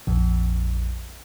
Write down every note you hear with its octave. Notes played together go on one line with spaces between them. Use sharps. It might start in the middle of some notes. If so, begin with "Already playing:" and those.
A#1 F2